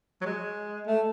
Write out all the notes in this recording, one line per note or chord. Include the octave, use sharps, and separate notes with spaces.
F#3
G#3
A3